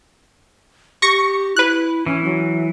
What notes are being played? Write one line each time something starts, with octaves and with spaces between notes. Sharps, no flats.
G4 C#6 A#6 C#7
E4 B4 F#6
E3 C#4
F#3